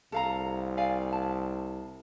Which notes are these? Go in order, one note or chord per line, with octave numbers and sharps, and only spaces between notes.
C2 A4 F5 A#5
D5 F5 G#5
A5